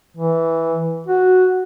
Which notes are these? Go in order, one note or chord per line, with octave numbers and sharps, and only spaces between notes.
E3
F#4